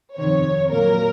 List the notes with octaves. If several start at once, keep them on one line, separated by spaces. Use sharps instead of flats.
F2 C3 D#3 C#5
A#2 F#3 A#3 A#4